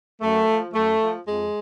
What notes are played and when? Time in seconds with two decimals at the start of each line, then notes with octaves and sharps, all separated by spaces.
0.21 F#2 A3
0.47 F3
0.74 F#2 A3
1.00 F3
1.27 F2 G#3